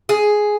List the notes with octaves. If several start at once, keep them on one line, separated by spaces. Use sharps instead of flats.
G#4